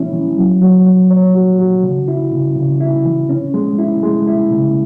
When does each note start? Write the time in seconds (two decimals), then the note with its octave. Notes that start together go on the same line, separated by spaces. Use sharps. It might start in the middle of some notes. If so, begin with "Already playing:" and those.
Already playing: E3 G#3 C#4 E4
0.13 E3
0.37 F#3
0.62 F#3
0.86 F#3
1.11 C#5
1.35 F#4
1.59 F#4
1.83 C#3
2.08 E4
2.32 C#3
2.56 C#3
2.81 E4
3.05 E3
3.29 C#4
3.54 G#3
3.79 E4
4.03 G#3
4.27 E4
4.51 C#3